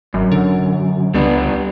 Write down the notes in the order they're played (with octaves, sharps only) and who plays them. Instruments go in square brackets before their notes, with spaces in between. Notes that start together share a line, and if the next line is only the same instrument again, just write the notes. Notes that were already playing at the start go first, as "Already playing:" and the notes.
[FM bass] G#1 [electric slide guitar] F#2
[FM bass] D3
[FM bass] C#2 [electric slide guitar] G3 B3 D4